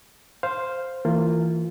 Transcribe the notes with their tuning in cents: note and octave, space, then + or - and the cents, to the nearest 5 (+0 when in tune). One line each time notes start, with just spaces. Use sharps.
C5 +0 F5 +0
E3 +0 A#3 -30 F4 +0